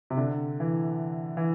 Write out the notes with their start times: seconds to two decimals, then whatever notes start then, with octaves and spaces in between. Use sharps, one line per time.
0.10 C3
0.17 D3
0.60 E3
1.37 E3